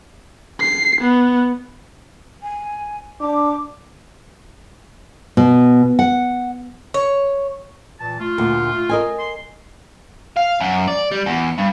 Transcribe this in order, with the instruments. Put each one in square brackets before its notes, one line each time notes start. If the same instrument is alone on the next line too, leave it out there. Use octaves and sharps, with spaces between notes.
[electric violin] C7
B3
[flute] G#5
[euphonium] D4 [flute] D6
[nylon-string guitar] B2
F#5
[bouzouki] C#5
[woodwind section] A#2 E3 A5
A3 F4
[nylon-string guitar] D2 A#2
A#4 D#5 G#5
[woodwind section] C6
[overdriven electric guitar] F5
F#2
D5
G3
E2
G2